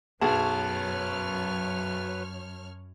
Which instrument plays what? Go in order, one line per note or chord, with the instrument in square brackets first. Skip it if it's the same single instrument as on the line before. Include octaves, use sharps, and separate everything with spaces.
[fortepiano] B1 G#4 [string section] F#2 C#5 F6 [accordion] F#3 B4 [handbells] A5